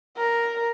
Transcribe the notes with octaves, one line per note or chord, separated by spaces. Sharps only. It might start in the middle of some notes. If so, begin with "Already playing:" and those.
A#4